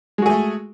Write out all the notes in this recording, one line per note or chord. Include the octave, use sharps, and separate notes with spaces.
G#3 A3 F#4 G#4